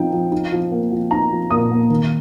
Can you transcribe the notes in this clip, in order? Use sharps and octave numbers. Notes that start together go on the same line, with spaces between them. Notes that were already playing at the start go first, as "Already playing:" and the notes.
Already playing: F3 C4 D#4 G5
F3
D#4
F3
A#3
F3
D#4 A#5
F3
A#2 D#6
A#3
D#3